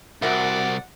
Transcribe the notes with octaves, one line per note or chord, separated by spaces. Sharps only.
C2 F#4 A#4 D5 E5 F#5